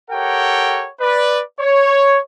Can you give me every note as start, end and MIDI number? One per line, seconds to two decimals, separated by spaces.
0.11 0.87 67
0.11 0.87 69
0.11 0.87 70
0.11 0.87 73
0.11 0.87 78
0.11 0.87 79
1.01 1.41 71
1.01 1.41 74
1.60 2.19 73